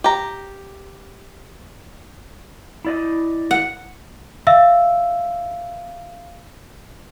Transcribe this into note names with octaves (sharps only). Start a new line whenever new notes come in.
G4 A#5
E4 D5 D#5
F#5
E5 F5 E6